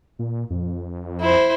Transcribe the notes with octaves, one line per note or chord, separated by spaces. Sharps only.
A#2
F2
E4 C5